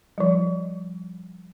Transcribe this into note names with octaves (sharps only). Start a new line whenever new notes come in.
F3 G3